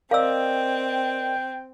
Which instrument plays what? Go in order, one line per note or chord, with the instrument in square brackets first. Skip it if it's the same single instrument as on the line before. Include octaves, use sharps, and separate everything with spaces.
[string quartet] C4 [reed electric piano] A#4 D5 D#5 [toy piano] F5 E6 [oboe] G5